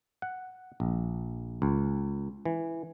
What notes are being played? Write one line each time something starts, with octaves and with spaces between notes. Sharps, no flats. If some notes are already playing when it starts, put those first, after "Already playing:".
F#5
A#1
C#2
E3